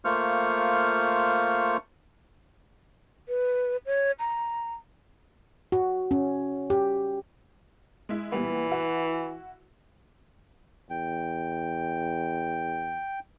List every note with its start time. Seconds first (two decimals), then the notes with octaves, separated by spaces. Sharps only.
0.05 A3 A#3 F4 C5 C#6 F6
3.29 B4
3.86 C#5
4.20 A#5
5.72 F#4
6.11 C#4
6.70 G4
8.09 G#3 E4
8.32 A#2 E3 G3 B3
8.71 E4 F#4
10.90 E2 G5